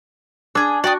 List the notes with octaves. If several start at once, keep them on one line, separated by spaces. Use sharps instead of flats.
D4 G#4 E6
F#4 D5 G5 D#6